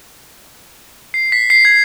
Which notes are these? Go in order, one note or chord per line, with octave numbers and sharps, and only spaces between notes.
C7
B6
C7
G#6